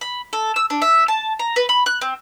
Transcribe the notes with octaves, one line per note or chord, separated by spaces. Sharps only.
B5
A4
E6
D4
E5
A5
A#5
B4
B5
F#6
C4